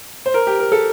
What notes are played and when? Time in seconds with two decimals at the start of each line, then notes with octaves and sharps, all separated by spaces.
0.26 C5
0.34 A#4
0.47 G4
0.59 A#4
0.72 A4